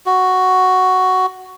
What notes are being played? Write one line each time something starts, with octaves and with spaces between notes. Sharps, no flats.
F#4